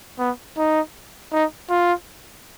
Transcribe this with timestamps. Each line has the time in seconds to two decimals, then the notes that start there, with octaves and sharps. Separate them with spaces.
0.19 B3
0.58 D#4
1.33 D#4
1.70 F4